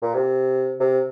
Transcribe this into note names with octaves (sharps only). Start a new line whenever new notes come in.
A#2
C3
C3